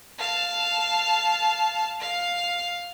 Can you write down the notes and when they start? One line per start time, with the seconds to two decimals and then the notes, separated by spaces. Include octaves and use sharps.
0.19 F5 A5
2.00 F5